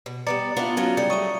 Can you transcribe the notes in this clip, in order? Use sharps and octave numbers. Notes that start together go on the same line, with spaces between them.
B2
G3 B3 D5 A#5 A6 C#7
B3 D4 E4 F4
F#3 C#4 F4
C#3 G3 C#7
F#3 A3 C#6 D#6 D#7